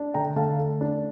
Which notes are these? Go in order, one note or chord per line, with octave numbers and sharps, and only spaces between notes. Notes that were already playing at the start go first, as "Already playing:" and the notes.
Already playing: D4
D3 G5 A#5
D3 F5 A5
A3
D4